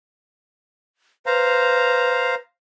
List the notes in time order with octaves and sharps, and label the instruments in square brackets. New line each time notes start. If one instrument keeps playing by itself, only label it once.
[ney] B4 [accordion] C5 F5 A#5